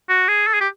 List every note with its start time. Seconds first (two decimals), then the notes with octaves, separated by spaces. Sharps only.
0.09 F#4
0.28 G#4
0.47 A4
0.54 G#4
0.61 G4